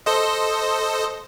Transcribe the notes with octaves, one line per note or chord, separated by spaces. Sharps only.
A4 C5 D#5